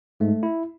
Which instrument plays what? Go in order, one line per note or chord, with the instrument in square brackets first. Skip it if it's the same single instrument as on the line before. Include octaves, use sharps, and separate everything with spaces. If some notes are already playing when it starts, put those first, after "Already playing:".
[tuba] G#2 [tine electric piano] A3
[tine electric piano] E4